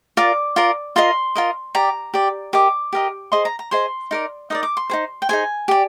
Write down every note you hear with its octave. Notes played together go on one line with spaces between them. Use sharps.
F4 A#4 D5 D6
F4 A#4 D5
F4 A#4 D#5 C6
F4 A#4 D#5
G4 D5 A#5
G4 D5
G4 A#4 D#5 D6
G4 A#4 D#5
G#4 C5 D#5 C6
A#5
A#5
G#4 C5 D#5 C6
D#4 A#4 D5
D#4 A#4 D5 D#6
D6
C6
D#4 G#4 C5
G5
D#4 G#4 C5 G#5
G4 D5